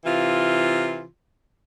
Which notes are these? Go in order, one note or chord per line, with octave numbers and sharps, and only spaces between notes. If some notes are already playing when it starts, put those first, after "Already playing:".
C3 E3 F4